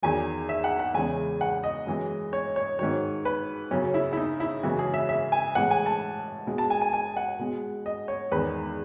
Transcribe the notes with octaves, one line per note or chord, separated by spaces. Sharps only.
E2 D#3 F#3 G#5
E5
F#5
F#5
E2 C#3 E3 G#3 G#5
F#5
D#5
F#2 E3 G#3
C#5
C#5
G#2 D#3 F#3 C#5
B4
F#2 C#3 F#3 C#4
E4
E4
D#4
E4
F#2 C#3 E3 G#3 F#4
G#4
E5
E5
G#5
A2 E3 G#3 F#5
G#5
A5
B2 G#3
A5
G#5
G#5
G#5
F#5
B2 G#3
D#5
C#5
E2 D#3 G#3 B4